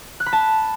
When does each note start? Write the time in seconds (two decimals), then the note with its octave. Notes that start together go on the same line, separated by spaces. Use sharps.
0.20 F#6
0.26 B5
0.33 A5